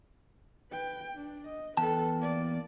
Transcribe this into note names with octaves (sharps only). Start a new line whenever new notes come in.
B4 G5
D4
D#5
E2 A4 B4 G5 A5
A#3 D5